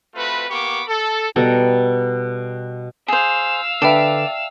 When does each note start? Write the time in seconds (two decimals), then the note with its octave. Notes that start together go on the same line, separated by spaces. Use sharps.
0.15 A3 C4 F4 F#4 B4
0.50 A#3 B3 G4 B5 C#6 D6
0.87 A4
1.36 B2 G3 A4 A#5
3.08 G#4 C5 F5 E6
3.82 D3 B4 D5 E5 G5 A5